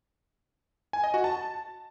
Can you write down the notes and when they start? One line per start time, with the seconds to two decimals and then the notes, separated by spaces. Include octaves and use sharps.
0.93 G#5
1.04 D#5
1.14 F#4
1.24 A5